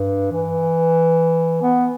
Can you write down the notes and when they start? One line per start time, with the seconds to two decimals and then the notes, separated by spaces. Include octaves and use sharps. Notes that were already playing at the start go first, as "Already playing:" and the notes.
Already playing: G2
0.32 E3
1.62 B3